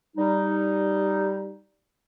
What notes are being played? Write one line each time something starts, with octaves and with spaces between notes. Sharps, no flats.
G3 D#4